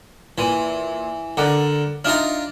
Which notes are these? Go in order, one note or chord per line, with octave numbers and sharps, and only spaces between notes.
A#2 E3 D#7
D3 A#4 D5 F#5
D4 D#4 F4 E5 A#5 F6